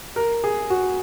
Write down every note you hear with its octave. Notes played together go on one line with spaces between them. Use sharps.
A#4
G#4
F#4